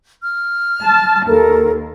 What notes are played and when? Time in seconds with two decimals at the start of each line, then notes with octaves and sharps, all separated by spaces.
0.23 F6
0.84 A5
1.27 D#2 A4 A#4